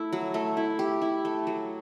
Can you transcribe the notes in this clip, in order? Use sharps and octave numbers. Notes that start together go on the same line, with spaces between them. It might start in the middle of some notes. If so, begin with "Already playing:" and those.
Already playing: A3 E4
F#3
A3
E4
G4
E4
A3
F#3